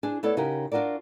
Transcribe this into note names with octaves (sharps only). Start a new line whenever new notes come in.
D4 G#4 C5
A3 B3 E4 A4 C#5 D5
C#3 D#4 F#4 G4 A#4
D4 F4 F#4 A#4 D5